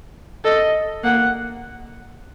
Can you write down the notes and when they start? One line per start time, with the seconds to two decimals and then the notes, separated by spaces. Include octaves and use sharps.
0.45 A4 D#5
1.04 A#3 F#5